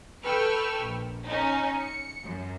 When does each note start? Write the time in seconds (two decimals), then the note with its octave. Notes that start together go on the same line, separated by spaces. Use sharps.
0.24 A4 B4 G5 C#6 E6 F6
0.82 A#1
1.27 C#4 D#4
1.80 C#7
2.23 F#2